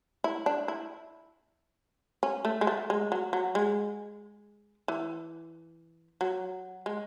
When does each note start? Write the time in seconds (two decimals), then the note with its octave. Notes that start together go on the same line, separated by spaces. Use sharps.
0.24 E4
0.46 D4
0.68 E4
2.23 C#4
2.45 A3
2.61 G#3
2.67 A3
2.90 G#3
3.12 F#3
3.33 F#3
3.55 G#3
4.88 E3
6.21 F#3
6.86 G#3